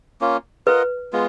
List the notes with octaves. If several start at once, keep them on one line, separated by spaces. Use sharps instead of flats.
A#3 C#4 F4
F4 A#4 B4 D#5 F#5
G#3 B3 F4